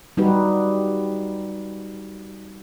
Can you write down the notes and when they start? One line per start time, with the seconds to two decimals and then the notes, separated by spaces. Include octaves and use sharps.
0.17 G3 D#4 F#4 G4 B4